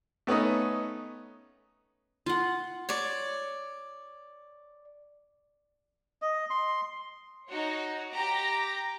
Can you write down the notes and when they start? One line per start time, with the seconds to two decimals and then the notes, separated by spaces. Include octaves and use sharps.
0.27 A3 B3 C#4 D#4
2.26 F4 F#5
2.89 C#5 D5
6.22 D#5
6.50 C6
7.49 D#4 F#4 C#5
8.12 G4 A#5 D6 A#6